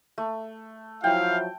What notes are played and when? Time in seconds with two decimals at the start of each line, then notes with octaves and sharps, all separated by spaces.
0.18 A3
1.04 F3 F#3 E4 F5 G5